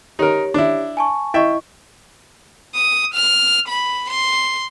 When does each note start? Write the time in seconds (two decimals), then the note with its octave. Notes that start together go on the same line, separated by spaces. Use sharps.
0.19 D#4 G4 A#4 C#5
0.54 D4 E4
0.97 G#5 A5 C#6
1.34 E4 D#5 E5 G5 C#6
2.75 D#6
3.15 F6
3.69 B5
4.11 C6